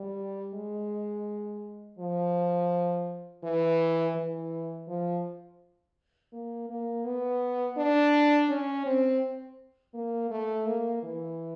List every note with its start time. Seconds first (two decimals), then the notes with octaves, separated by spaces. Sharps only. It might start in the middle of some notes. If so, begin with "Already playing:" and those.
Already playing: G3
0.54 G#3
1.99 F3
3.43 E3
4.16 E3
4.87 F3
6.33 A#3
6.70 A#3
7.05 B3
7.77 D4
8.49 C#4
8.86 C4
9.94 A#3
10.30 A3
10.67 A#3
11.03 E3